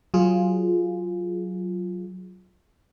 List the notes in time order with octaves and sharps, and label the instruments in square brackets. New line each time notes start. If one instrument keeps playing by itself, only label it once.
[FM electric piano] F#3 F4 G#4